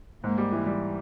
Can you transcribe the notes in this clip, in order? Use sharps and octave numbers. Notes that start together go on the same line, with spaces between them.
G#2 G#3 A#3
G3
E3
G3